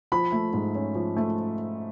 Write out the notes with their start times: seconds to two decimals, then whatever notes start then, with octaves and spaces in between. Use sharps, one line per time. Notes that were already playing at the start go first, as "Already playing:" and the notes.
0.12 F3 B5
0.32 A3
0.54 G#2
0.75 C#4
0.95 F3
1.17 A3